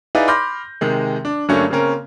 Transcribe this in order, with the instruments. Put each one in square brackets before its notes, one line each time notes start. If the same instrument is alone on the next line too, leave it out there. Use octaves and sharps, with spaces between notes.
[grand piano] D#4 E4 G#4 B4 D5 F5
B5 C6 D6 F6 G6 A#6
C3 D#3 G#3
D4
G2 D3 F#3 A3 A#3 C#4
C#3 A#3 C4 C#4 A#4